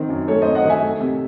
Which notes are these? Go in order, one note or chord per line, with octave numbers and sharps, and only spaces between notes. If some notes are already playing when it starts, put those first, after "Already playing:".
Already playing: D#3 C4
F#2
A3 A4 C#5
C4 C5 D#5
D#5 F#5
D#3 E5 G#5
A3
C3